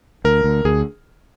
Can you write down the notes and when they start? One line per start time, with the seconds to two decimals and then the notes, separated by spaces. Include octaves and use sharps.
0.25 D2 A#4
0.44 D2
0.65 D2 G#4